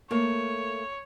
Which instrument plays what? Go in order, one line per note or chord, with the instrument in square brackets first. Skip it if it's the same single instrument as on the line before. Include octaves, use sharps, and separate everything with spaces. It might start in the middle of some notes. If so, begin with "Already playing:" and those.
[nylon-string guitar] A3 A#3 [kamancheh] C#5